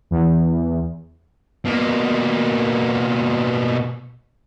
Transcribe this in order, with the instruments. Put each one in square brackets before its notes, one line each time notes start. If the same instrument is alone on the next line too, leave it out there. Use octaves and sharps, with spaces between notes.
[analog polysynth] E2
[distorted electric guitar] B2 A#3